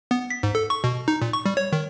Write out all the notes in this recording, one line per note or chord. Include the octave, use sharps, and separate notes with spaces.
B3
B6
G#2
A4
C#6
B2
D#4
A#2
C#6
G3
C#5
D#3